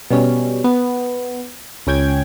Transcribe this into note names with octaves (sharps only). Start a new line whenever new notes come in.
B2 G3 C#4
B3
C#2 C#4 G5 G#6